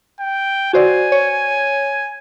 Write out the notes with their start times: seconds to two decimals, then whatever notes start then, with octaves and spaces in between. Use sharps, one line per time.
0.20 G5
0.73 F#4 C5 D5 G#5
1.12 C#5